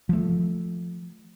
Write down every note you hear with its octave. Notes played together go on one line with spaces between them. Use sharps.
F3 A3